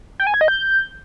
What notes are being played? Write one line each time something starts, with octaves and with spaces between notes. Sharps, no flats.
G5
G#5
G#6
D#5
G6